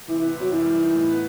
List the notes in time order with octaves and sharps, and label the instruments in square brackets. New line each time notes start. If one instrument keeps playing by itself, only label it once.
[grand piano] C3 [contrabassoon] E3
[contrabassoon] E3 [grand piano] B3
[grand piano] C3 [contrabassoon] F#3
[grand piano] F#2 [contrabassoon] E3
[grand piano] G3
D#4
A2
B3